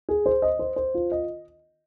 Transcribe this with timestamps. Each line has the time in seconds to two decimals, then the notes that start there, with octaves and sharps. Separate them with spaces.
0.09 G#4
0.26 C5
0.42 D#5
0.59 C5
0.76 C5
0.94 F4
1.12 D#5